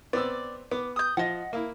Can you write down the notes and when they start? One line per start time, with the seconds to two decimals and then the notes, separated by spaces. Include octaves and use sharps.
0.13 B3 C4 D5 E6
0.72 B3 D6
0.96 D#6 G6
1.17 F3 D#5 F#5
1.53 A#3 E4